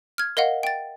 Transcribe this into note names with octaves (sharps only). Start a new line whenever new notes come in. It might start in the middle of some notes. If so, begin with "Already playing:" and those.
F6 G#6
A#4 D#5 F5 F#5
G5 A6